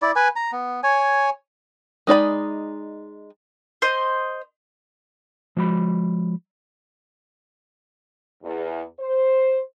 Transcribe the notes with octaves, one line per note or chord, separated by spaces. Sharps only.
E4 D5
B4 G#5
A#5
B3
C#5 G#5
G#3 D#4 D5 B5
C5 D#5
F3 G#3 F#4 B5
E2
C5